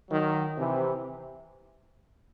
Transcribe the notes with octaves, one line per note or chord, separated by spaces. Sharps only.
D#3 F#3
C3 E3